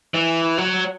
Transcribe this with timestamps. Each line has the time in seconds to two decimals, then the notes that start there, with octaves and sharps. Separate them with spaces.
0.14 E3
0.58 F#3